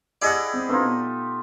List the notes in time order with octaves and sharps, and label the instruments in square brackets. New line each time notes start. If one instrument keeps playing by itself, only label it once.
[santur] E4 G4 G#4 [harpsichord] D5 D#5 F#5
[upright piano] C4
[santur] A3 D#4 F4 [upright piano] C4 D4 B4
[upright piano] B2